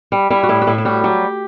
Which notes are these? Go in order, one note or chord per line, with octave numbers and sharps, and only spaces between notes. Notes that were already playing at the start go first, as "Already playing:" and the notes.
G3
G3 E4
F#4
A2 E4
F#4
A2 E4
E4
G3 F#4
F#3 G4